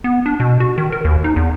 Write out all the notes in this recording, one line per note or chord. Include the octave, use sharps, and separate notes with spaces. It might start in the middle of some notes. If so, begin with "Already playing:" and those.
B3
D4
B2
F#4
D#3
A#4
D#2
D#4
E2